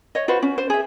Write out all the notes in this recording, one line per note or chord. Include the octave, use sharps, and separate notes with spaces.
C#5 D#5
F4 F#4 B4 C5
C#4
C5
G#4 E5